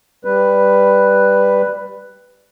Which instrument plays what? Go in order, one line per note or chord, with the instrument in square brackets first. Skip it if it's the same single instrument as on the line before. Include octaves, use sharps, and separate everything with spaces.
[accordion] G3 B4